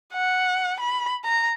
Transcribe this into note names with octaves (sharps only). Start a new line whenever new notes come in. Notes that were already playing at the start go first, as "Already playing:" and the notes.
F#5
B5
A#5